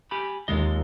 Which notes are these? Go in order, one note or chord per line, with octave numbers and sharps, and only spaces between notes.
G4 G#5 B5
D#2 G#3 F4 D#5